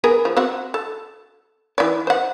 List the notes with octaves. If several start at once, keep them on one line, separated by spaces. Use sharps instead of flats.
B3 G#4 A#4
F3
C4 F#4 F#5
A4
E3 D5
C5 F#5